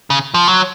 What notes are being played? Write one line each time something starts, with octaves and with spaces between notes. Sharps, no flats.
C#3
F3
F#3